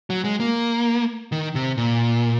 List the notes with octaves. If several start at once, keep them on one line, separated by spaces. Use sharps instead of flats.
F#3
G#3
A#3
D#3
C3
A#2